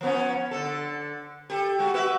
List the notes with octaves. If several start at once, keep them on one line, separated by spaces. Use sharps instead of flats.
F3 B3 C#4
D3 A4
G4 A4
G#3 F#4
F#4 B4 E5